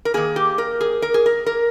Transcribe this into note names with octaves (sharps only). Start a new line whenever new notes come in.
A#4
D#3 A#3 G#4
G4
A#4
G#4
A#4
G#4
A#4
A#4